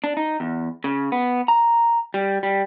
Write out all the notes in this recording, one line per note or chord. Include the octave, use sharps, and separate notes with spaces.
D4
D#4
E2
C#3
B3
A#5
G3
G3